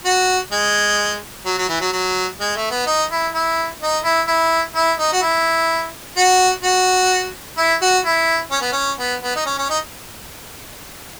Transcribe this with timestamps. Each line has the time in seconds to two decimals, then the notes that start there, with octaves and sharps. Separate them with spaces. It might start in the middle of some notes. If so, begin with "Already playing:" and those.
0.05 F#4
0.52 G#3
1.46 F#3
1.58 F#3
1.69 E3
1.81 F#3
1.92 F#3
2.40 G#3
2.56 A3
2.71 B3
2.86 D#4
3.11 E4
3.34 E4
3.82 D#4
4.04 E4
4.28 E4
4.75 E4
4.99 D#4
5.13 F#4
5.22 E4
6.17 F#4
6.63 F#4
7.58 E4
7.82 F#4
8.05 E4
8.51 C#4
8.61 B3
8.72 C#4
8.99 B3
9.23 B3
9.36 D#4
9.46 C#4
9.58 C#4
9.70 D#4